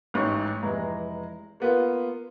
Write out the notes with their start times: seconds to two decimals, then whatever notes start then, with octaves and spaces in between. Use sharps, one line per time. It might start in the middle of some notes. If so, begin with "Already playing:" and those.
0.14 A1 G#2 C#5 C#6
0.63 F1 E3 G#3 A#5
1.60 A#3 B3 F4